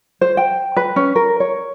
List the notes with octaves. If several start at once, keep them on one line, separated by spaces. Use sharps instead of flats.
C5
G5
B4
C#4
A#4
C#5